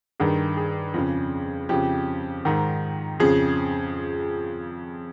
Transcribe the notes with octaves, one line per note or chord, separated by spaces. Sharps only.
G2 D#3 G#4
G#4
F2 C#3
F2 C#3 G4
G#2 D#3
F2 C#3 G#4